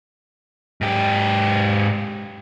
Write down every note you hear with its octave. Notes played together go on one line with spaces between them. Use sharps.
G#2 G4